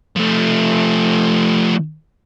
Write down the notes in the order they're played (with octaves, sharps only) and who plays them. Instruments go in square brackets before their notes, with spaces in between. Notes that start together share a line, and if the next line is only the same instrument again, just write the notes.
[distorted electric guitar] F3 A3